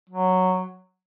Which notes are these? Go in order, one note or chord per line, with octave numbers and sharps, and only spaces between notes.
F#3